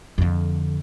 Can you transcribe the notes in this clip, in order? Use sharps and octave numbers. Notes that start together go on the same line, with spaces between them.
F2 D3